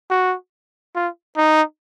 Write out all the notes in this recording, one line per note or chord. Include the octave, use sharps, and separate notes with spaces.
F#4
F4
D#4